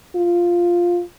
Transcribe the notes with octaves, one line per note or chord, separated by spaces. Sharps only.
F4